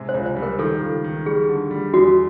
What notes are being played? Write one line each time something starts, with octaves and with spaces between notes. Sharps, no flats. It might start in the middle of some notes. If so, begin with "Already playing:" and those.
Already playing: C3 G#3
C5
C#2
C5
G3
A#4
D#3 A4
C#2
D#3
G3 G#4
D3
G3
E2 F#4